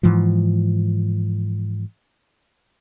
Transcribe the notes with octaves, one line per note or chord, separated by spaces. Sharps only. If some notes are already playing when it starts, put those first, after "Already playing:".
G#2 E3 F3